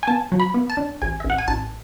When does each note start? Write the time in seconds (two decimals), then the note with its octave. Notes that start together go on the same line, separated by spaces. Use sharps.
0.03 G#5
0.08 B3 A5
0.32 F#3
0.40 B5
0.54 B3
0.70 A5
0.77 D4
1.02 A1 G#5
1.20 E5
1.24 A1
1.30 F#5
1.38 G#5
1.48 A1 A5